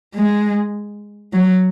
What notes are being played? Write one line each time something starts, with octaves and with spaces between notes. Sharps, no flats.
G#3
F#3